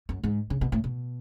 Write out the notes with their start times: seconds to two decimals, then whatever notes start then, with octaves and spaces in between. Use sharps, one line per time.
0.09 F#2
0.23 G#2
0.50 C#3
0.61 B2
0.72 A2
0.84 B2